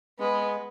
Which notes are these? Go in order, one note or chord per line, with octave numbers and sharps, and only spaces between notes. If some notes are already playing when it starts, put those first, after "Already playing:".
G#3 B3